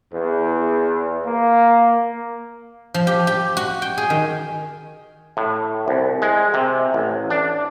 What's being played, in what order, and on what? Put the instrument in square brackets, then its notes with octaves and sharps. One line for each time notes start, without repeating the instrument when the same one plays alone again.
[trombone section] E2
A#3
[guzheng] F3
G4
G4
F#4
G5
G#4
D#3
[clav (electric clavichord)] A2
C2
G#3
C3
A1
D4